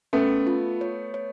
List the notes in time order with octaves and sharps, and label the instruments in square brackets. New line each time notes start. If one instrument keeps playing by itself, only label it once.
[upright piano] A3 B3 [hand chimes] C#4
[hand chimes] F4
C#5
C#5